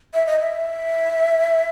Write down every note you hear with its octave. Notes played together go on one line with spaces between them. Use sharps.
E5
D#5
E5